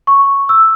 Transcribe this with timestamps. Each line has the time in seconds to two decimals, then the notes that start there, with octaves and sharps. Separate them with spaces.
0.07 C#6
0.49 E6